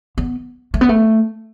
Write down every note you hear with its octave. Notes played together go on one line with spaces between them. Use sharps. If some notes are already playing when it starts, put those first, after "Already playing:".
B3
A3
B3
A3